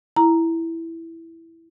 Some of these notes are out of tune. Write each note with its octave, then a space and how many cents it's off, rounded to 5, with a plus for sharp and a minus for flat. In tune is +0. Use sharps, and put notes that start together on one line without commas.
E4 +0 A#5 +0